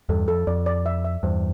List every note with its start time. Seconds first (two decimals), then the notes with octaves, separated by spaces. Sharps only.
0.09 E2 G2 A4
0.28 F2 A4
0.47 F2 D5
0.66 D5
0.86 E5
1.04 E5
1.23 E2 G2 C5